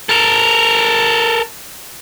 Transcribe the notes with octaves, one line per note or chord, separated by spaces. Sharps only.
A4 A#4